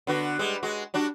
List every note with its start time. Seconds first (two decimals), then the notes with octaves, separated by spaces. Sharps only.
0.07 D3 B3 F#4
0.39 G3 G#3
0.63 G#3 F#4
0.94 G3 D4 F#4